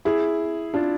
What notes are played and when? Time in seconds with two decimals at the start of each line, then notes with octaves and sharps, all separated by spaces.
0.05 E4 G#4
0.74 D4 F4